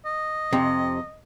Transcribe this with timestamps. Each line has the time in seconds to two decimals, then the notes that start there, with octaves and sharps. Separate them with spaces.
0.05 D#5
0.53 F2 C3